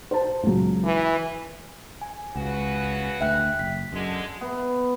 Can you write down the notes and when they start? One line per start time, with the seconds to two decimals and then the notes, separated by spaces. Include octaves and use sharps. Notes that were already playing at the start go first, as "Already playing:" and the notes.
0.11 C5 A5
0.43 C#2 F#3
0.84 E3 B4
2.02 G#5
2.36 C#2 C#3 F#4 B4
3.21 D2 E5 G5 F#6
3.59 F#1 B6
3.93 F#2 D3 G#3
4.41 B3